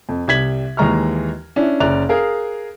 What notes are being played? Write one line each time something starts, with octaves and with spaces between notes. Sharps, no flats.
F2
C2 G3 G#6 B6 F#7
D#2 E3 G#3 A#5 C#6 F6
C#4 D4 E4
F#1 C#4 D5 A#5 F#6 F7
G#4 A#4 F5